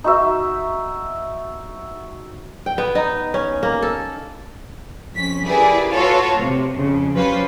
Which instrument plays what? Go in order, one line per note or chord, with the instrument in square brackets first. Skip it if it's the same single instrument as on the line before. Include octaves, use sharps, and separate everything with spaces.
[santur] D#4 F#4 E5
[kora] G5
B3
D#4
C#4
A#3
A4
[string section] F2 C#4 B6
E4 G4 G#4 A#4 B4 D5
F4 F#4 A4 B4 C#5 F5
C3
F2 C#3
F#3 C#4 F4 G4 B4 C5